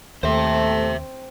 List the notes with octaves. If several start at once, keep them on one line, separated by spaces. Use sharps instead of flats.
D#2 A3 C4 C5 E5